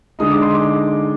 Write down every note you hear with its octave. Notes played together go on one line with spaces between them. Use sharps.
D3 G#3 D#4 D#6
D6
C6
D6